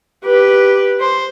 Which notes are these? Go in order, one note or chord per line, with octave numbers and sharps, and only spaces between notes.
G4 B4
C5